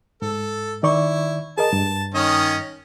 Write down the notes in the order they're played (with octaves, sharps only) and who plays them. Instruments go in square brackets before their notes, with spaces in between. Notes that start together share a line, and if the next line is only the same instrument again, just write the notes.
[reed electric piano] G#2 [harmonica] A4
[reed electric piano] D#3 D5 C#6 [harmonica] E4
[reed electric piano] G#4 A#4 D#5 [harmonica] A5
[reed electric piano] G2
[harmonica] D#3 C#4 D#5